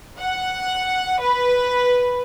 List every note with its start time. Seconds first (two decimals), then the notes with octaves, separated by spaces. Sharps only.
0.19 F#5
1.21 B4